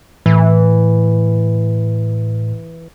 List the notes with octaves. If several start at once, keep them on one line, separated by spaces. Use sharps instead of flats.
A2 E3